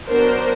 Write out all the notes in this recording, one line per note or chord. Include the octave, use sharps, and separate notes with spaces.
F#3 B3 D4 A#4 C5